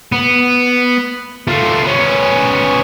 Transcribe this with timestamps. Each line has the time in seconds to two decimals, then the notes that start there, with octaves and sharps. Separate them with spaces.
0.12 B3
1.48 A3 F4
1.85 B3 C#4